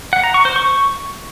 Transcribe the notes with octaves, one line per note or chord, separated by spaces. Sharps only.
F#5
A#5
C#6
C5
C#6